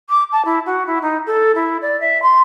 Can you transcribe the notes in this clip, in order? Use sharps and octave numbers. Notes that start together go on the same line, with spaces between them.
D6
A5
E4
F#4
E4
D#4
A4
E4
D5
E5
C6